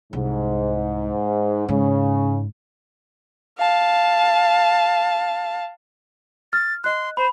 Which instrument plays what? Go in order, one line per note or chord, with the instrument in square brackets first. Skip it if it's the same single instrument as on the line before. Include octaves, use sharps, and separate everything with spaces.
[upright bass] C2 [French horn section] G#2
[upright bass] G#2 [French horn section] C#3
[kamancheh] F5 A5
[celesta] F6 [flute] A6
[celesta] D#5 F#6 [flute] C6
[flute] C5 [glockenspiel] B5